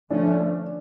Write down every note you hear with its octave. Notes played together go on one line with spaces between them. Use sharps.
D3 F3 A3 C#4 D4